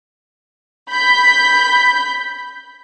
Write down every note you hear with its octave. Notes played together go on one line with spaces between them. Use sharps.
B5 G6 B6